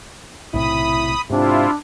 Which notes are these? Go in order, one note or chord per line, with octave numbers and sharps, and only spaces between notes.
B1 A2 C3 E4 B5 D#6
G#2 C3 D4 E4 F4